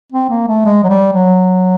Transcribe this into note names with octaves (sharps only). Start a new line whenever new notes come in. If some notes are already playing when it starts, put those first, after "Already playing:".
C4
A#3
A3
G#3
F#3
G3
F#3